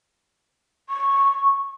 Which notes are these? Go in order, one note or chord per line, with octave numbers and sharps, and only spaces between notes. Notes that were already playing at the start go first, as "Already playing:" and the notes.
C#6